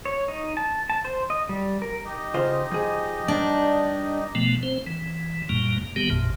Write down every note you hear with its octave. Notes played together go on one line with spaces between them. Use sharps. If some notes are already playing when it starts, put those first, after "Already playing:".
C#5
D#4
A5
A5
C5
D#5
G3
A#4
D#4 G4 D#5
C#3 F4 C5
F3 G#4
G2 D4 D5
B2 F3 A3 B3
C4 C5
E3
F#2 A#2 G3 A#3
D#3 G3 B3 G4
A1 F2 A#2